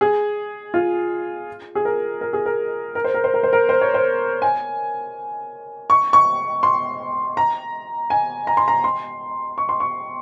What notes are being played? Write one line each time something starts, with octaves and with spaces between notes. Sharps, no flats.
G#4
F4
G#4
A#4
A#4
G#4
A#4
A#4
C5
A#4
C5
A#4
C5
A#4
C5
C#5
C5
G#5
C#6
C#6
C6
A#5
G#5
A#5
C6
A#5
C6
C#6
C6
C#6